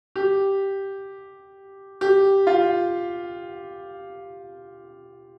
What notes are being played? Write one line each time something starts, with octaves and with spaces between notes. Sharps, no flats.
G4
G4
F4